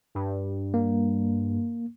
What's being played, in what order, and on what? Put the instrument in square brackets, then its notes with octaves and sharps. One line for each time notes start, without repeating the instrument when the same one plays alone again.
[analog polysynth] G2
[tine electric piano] A#3